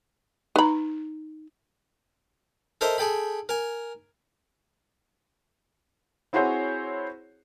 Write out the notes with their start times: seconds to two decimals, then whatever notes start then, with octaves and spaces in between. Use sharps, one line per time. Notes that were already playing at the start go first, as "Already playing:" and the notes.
0.56 D#4 B4 A#5 B5
2.81 A4 A#4 C5 D#5 E5
2.98 G#4 A4 G5 B5
3.49 A#4 G#5
6.33 C4 E4 F#4 G#4 C5 C#5